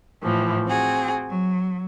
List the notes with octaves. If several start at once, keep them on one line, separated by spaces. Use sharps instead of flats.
A2 E3 F3
C4 F#4 G#4
F#3